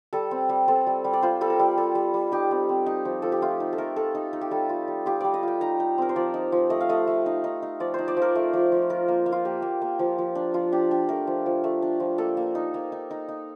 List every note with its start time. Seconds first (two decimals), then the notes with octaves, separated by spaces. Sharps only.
0.13 G3 A4
0.31 C4
0.49 G3
0.68 C4 A4
0.87 G3
1.04 G3
1.13 D5
1.22 F4 C5
1.41 G3 A4
1.50 A#4
1.59 G3
1.77 G3 A4
1.95 G3
2.14 G3
2.32 D#4 G4
2.51 C4
2.69 C4
2.86 D#4
3.05 F3
3.22 F3 A4
3.32 G4
3.42 A3 F4
3.60 D#4
3.73 A4
3.78 A3 A#4
3.96 A3 A4
4.15 D#4
4.33 D#4
4.41 G4
4.51 G3 A4
4.69 F4
4.88 G3
5.06 F4 G4
5.21 G3 D5
5.34 D#5
5.43 F4 G5
5.61 D#4 A#5
5.80 D#4
5.98 C4 A#4
6.09 C5
6.16 F3 D5
6.34 D#4
6.52 F3
6.70 A3 D#5
6.80 F5
6.89 A3 D#5
7.07 A3
7.26 D#4
7.44 D#4
7.62 D#4
7.80 F3 D5
7.94 D#4 C5
8.08 D5
8.17 F3
8.22 A#4
8.35 A3
8.53 F3
8.72 F3
8.90 F4 A#4
9.08 A#3
9.26 A#3
9.32 F4
9.45 A#3 G4
9.62 A#3
9.82 A#3
9.99 F3
10.18 F3
10.35 D4
10.54 F3 F4
10.72 D4 G4
10.91 D4 G4
11.09 A3 A#4
11.27 F3
11.46 F3
11.64 A3
11.82 D4
12.00 F3
12.18 A#3 A4
12.37 A#3
12.55 D#4
12.74 A#3
12.92 D#4
13.11 D#4
13.29 D#4